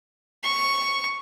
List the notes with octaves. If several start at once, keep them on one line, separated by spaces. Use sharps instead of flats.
C#6